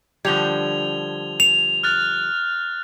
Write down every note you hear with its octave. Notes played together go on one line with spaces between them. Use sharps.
D3 F3 G3 G#6 F7 G7
F7
F6 F#6 A6